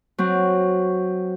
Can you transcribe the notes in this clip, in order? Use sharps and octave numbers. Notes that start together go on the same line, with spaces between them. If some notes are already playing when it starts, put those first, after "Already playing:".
F#3 C4